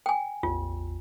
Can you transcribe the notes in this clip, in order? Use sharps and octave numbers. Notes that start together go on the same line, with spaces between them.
G5 G#5
A1 E2 F4